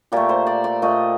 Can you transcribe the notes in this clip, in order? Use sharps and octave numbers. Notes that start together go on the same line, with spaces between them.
A#2 A3 G4
C5
D5
D5
A#2 A3 D#5